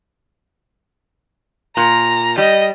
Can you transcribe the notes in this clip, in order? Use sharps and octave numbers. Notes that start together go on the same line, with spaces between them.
A#2 A#5
G3 D#5